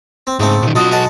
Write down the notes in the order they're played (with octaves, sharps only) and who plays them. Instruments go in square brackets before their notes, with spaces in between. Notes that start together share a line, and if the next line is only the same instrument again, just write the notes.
[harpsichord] C4
[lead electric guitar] G#2 [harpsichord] C#3 A3 C4
[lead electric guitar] A#2 D#3
[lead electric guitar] B1 F#4 [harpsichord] F2 D3 D#5
[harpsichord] G#3 F#5 A5